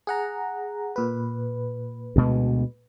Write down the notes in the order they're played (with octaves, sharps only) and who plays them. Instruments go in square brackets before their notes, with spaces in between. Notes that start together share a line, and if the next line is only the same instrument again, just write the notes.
[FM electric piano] G#4 F#5 A#5
A#2 B4
[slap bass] D2 B2 G#3